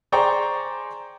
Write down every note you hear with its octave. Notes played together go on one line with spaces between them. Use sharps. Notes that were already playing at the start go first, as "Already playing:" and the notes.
G#4 C5 D5 G5 A#5 C#6